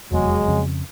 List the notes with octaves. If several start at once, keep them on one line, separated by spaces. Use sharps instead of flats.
F1 E2 F#3 G#3 B3
F2 C#3